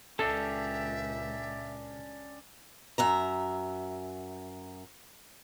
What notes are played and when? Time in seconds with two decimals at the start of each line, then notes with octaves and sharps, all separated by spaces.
0.19 C#2 A#2 C#4 D4 G4 A4 E5
2.98 F#2 E5 A#5